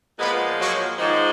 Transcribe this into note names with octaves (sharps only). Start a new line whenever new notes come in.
A#2 F3 G#3 B3 B4
F#3 F#4
G#2 D#3 F3 G#3 D#4